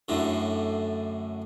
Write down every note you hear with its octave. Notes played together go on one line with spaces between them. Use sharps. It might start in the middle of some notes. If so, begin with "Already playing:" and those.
F#2 A2 D3